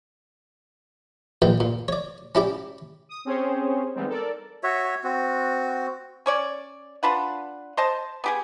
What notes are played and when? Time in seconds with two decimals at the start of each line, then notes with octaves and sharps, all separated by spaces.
1.42 A#1 A#2 E3 G5
1.60 A#2
1.88 C#5 D5
2.35 C#4 E4 G4 D5
3.09 D#6
3.25 C4 C#4 G4 G#4 C5 C#5
3.94 E3 G3 G#3 B3 C4 D#4
4.09 A4 A#4 D5
4.63 F#4 C#5 E5
5.04 C4 F#4
6.26 C#4 C#5 D5
7.03 D4 F4 B4 F#5
7.77 C5 D#5 A5
8.24 B3 G4 G#4